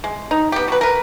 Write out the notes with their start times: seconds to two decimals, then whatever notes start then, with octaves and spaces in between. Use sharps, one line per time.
0.04 G#3
0.31 D#4
0.52 B3 G4
0.68 F#3 B4
0.81 A#4 B4